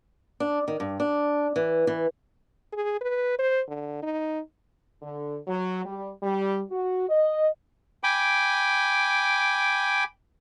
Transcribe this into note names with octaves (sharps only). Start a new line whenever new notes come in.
D4
D#3
G2
D4
E3
E3
G#4
B4
C5
D3
D#4
D3
F#3
G3
G3
F#4
D#5
G5 G#5 B5 D6